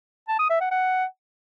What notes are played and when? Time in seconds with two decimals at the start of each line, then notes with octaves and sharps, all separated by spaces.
0.28 A5
0.39 D#6
0.50 E5
0.60 F#5
0.71 F#5